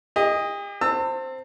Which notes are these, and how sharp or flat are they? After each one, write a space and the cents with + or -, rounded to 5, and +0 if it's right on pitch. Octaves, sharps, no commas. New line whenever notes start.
G4 +45 D#5 +0
C4 +0 A5 +40 E6 +0